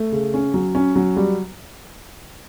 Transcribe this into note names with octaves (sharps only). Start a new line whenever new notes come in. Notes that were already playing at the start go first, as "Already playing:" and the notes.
Already playing: A3
C#3
C#4
F#3
C#4
F#3
G3